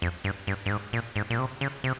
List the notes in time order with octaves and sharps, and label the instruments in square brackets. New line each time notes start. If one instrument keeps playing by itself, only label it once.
[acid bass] F2
G2
G2
G2
G#2
A#2
G#2
A#2
C3
C#3
C3